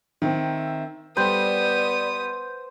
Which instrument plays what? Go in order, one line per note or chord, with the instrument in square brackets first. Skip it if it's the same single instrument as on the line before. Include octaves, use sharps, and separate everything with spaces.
[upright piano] D#3 C4 [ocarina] E5
[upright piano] G3 [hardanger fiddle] B3 D#6 [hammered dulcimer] C5 [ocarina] D5